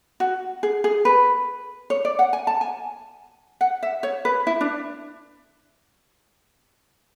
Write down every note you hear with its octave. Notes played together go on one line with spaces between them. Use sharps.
F#4
G#4
G#4
B4
C#5
D5
F#5
G#5
A5
G#5
F#5
E5
C#5
B4
E4
D4